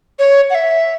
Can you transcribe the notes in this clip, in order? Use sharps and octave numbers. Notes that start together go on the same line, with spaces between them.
C#5
F#5
E5